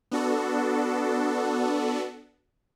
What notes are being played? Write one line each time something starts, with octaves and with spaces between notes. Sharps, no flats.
B3 D4 F#4 A4